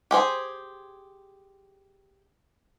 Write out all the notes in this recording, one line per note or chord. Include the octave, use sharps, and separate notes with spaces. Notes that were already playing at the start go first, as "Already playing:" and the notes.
G4 G#4 C5